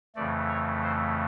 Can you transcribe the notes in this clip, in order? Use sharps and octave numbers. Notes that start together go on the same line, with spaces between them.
F2 C#3 E3 A3 D5
C#5
C5